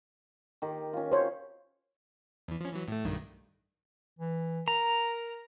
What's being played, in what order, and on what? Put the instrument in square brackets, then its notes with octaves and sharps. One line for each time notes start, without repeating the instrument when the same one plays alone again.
[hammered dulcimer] D#3 G4
C#4 F4
[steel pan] C5 C#5
[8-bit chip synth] E2 E3
F3 C#4
E3 F#3
A2 A3
B1 G2 D#3
[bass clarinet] E3
[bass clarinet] A#4 [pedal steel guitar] A#5